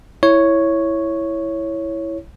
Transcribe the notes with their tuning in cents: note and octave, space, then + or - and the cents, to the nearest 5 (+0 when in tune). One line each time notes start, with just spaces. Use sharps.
E4 +0 C#5 +0